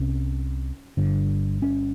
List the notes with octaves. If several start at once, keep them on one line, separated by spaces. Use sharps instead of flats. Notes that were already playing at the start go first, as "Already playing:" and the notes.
Already playing: C2 C3 C#4
G1 G2 D3
C#4